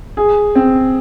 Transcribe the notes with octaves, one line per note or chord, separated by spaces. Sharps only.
G#4
C4